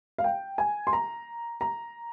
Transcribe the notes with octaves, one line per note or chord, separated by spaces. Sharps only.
F5
G5
G#5
C6
A#5
A#5